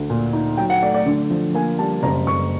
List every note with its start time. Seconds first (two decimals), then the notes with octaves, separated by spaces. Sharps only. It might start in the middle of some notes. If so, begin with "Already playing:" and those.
Already playing: D2
0.10 A#2
0.33 D#4
0.57 F#3 G5
0.70 F#5
0.83 A3 D5
0.94 D5
1.06 D3
1.30 F3
1.54 A#3 G#5
1.79 G3 A5
2.03 F#1 A#5
2.27 F#1 C#6